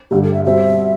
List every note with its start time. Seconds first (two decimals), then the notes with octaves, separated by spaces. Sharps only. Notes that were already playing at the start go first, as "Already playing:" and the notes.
0.11 G2 D3 G3 G4
0.23 A4
0.33 E5
0.45 B2 G3 C4 E5